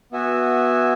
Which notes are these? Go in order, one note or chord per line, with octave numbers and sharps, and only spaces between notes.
B3 F#4 E5 G#5